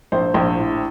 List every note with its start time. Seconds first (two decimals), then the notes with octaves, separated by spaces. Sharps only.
0.12 A#1 C5
0.34 A#1
0.56 A2